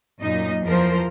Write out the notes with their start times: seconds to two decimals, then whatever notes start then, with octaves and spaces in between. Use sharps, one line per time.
0.21 F#2 A#2 D#4 D#5
0.63 E2 F3 A#4 C5